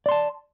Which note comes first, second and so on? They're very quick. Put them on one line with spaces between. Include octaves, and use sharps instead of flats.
D5 C6 A5